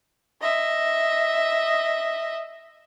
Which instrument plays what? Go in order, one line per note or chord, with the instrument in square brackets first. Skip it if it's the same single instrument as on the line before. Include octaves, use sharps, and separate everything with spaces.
[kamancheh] D#5 E5